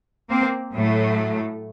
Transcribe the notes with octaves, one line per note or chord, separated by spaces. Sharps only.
A#3 C4
A2 F#3 A3